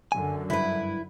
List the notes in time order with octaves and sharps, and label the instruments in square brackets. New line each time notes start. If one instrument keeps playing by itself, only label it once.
[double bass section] F#2 D3 [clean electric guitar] G#5
[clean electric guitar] C#2 G2 [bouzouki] E4 B4